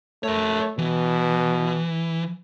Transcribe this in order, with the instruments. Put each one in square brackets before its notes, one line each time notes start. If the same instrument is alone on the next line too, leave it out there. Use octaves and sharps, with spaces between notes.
[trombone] A3 [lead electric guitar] A#4 C#5
[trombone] B2 [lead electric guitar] E3